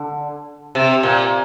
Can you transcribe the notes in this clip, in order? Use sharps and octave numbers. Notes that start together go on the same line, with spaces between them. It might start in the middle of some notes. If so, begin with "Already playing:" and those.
Already playing: D3
C3
A#2